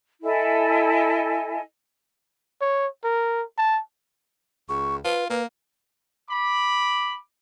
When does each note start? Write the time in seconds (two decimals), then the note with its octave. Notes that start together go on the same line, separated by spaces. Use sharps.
0.23 E4 A4 D#5 G#5
2.61 C#5
3.04 A#4
3.58 A5
4.69 C#2 C#6
5.04 F4 B4
5.30 A#3 B4
6.30 B5 D6